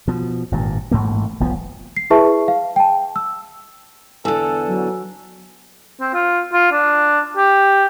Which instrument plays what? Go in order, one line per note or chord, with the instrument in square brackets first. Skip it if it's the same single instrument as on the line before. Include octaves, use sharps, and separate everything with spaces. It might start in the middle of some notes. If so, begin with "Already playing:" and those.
[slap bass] B2 F3
G#1 G2 A#2
A1 G#2 A3 A#3
E1 B1 F3 B3
[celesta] C7
E4 G#4 B4 E5 A5 C#6
F5
G5 A5
E6
[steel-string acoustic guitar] E2 D3 [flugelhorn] A4 [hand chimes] G#5 E6
[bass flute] F#3
[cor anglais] C4
F4
F4
D4
G4